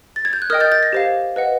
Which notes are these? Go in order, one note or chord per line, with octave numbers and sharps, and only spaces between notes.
A6
G#6
G6
F#6
A#4 D#5 G5 D#6 F6
G6 A6
G6 A6
G#6 A#6
G4 C5 F5
B4 D#5 F#5